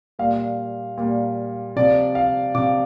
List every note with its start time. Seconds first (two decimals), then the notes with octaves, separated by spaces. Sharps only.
0.19 A#2 G3 F5
0.98 A#2 G3
1.76 C3 F3 D5
2.15 F5
2.55 C3 F3 D6